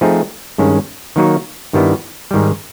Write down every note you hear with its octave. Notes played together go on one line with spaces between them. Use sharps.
F3 A3 C4 D#4 G#4
G2 D#3 G#3 C#4
D#3 F#3 A#3 D#4 F#4
G2 D#3 G3 B3 E4
G#2 D#3 G3